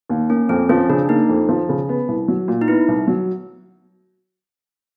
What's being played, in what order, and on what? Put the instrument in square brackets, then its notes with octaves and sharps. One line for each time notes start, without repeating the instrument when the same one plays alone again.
[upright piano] D#2
[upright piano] A#3 [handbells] C#4
[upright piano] F2 [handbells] C4
[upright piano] F3 [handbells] C#4
[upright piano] C#3 [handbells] D4
[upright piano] A#3 [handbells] D#4
[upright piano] F2
F3
C#3
B3
C2
F#3
A#2
[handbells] D#4
[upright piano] B3 [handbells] E4
[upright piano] C2
F#3